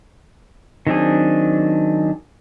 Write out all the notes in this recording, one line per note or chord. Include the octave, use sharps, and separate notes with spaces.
D#3 F#3 C4 D4 G#4